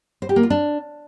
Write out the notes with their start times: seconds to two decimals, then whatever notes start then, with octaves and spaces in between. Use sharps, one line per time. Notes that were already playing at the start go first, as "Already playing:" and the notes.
0.22 C5
0.29 G4
0.36 A#3
0.43 F4
0.50 D4